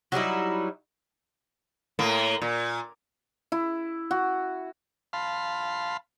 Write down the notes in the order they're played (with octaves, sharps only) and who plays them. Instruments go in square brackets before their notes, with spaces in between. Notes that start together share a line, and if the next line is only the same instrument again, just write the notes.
[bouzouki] F#3 G3 D#4 E4
[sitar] A2 A#3
A#2
[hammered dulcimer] E4
F#4
[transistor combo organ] F5 A5 B5 C6